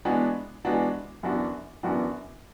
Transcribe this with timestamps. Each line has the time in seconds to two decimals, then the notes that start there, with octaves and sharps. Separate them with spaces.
0.05 E3 G#3 B3 D4 F#4
0.65 E3 G#3 B3 D4 F#4
1.23 F#2 E3 B3 D4 F#4
1.83 F#2 E3 B3 D4 F#4